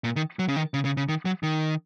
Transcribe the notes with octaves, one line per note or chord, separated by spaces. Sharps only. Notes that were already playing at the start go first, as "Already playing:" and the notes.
A#2
D#3
F#3
C#3
D#3
C#3
C#3
C#3
D#3
F#3
D#3